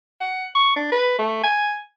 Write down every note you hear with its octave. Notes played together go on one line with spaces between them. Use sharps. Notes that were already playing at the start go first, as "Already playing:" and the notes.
F#5
C#6
D4
B4
A3
G#5